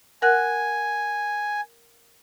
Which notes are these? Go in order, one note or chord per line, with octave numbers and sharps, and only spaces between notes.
A#4 F#5 G#5 F#6